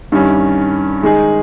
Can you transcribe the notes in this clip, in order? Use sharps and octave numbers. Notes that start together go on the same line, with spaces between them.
G2 D#3 G3 C#4
D#3 G#3 D#4 G#4